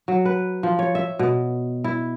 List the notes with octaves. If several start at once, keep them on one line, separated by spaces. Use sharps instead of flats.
F#3
B4
F3
C#5
E5
B2
E4